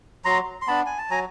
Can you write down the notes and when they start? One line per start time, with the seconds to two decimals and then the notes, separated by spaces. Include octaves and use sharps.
0.25 F#3 A#5 C6
0.62 C6
0.67 B3 D4 A5 B5
0.86 G#5
0.98 A5
1.10 F#3 G#5 A#5